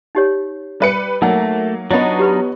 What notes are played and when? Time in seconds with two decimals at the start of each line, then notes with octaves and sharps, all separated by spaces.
0.15 D#4 G4 C#5
0.80 G3 B4 C#7
1.22 F#3 A3 A#3 D#4 F#5 E6
1.91 F#3 B3 D4 D#4 F4 C#5 D#5 B5
2.19 G4 B4 B5